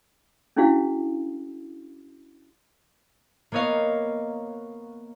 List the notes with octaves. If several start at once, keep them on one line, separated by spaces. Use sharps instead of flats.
C#4 D4 E4 F#4 G#4 F5
A#3 B3 C#5 D#5 F5